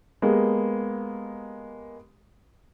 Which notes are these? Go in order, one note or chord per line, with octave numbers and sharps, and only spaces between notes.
G#3 A#3 B3 G4